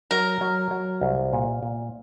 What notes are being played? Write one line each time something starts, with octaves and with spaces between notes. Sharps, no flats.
F#3 A#4
F#3
F#3
C2
A#2
A#2